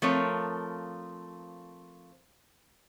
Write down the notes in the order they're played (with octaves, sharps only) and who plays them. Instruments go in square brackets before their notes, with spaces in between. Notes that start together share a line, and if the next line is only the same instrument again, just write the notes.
[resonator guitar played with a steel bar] F3 A3 C4 A#4 C#5